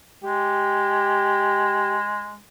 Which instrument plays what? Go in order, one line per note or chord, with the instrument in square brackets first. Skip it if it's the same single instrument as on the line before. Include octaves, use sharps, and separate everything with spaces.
[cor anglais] G#3 [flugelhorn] G4